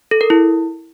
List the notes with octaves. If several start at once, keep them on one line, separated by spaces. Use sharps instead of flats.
A4
A#4
E4